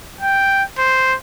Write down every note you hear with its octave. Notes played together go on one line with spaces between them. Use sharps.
G5
C5